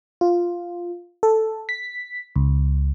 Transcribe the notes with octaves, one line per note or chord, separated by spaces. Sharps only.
F4
A4
B6
C#2